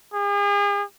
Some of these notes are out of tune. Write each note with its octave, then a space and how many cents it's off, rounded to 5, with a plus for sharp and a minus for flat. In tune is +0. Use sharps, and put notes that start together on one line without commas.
G#4 -40